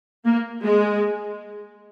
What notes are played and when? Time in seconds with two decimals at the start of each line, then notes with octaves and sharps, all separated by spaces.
0.25 A#3
0.63 G#3